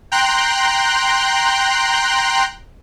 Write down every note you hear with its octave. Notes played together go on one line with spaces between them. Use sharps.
G5 A#5 C6 F#6